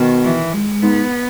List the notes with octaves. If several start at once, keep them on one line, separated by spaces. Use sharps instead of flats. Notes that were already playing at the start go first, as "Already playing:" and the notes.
Already playing: B2 D#3
E3
G#3
G#2 B3